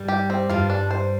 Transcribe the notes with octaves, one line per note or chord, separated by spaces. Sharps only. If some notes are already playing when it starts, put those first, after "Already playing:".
Already playing: G2 G3
G4
C4
G2 G3 F4
D4
C5